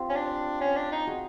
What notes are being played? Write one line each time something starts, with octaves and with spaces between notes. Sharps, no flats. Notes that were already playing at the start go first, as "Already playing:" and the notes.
Already playing: C4 F4 G4
C#4
D4
C#4
D4
D#4
F#4 G#4